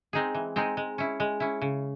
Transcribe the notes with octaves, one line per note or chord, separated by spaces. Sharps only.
G#3 C4 D#4 G#4
E3
G#3 C4 D#4 G#4
G#3
C#4 E4
G#3
C#4 E4
C#3